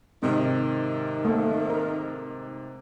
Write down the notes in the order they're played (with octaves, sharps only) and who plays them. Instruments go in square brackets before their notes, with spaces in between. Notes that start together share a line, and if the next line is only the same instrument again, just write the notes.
[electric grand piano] G#2 C3 [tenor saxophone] D#3 [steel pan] C4
[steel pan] A3 A#3
A#4